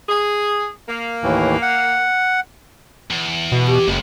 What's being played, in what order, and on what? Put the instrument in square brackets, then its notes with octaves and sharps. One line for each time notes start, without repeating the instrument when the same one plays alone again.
[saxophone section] G#4
A#3
[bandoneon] D#2 A2 E3
F#5
[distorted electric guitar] E2
[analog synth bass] B2
[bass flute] G4
[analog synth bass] F#1 [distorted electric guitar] C#2